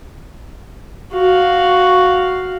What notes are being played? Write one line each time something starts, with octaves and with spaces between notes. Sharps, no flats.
F#4 F5